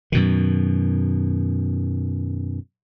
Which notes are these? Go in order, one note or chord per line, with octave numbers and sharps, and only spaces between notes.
F#2 B2 D#3